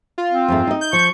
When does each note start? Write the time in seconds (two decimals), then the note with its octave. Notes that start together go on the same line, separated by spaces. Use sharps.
0.18 F4
0.32 C4
0.48 F2 G#2 A3
0.67 D#4 D#5
0.81 G6
0.93 F3 C#6